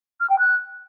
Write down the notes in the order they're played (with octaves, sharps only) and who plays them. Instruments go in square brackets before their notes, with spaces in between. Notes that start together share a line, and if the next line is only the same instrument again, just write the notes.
[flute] F6
G5
F#6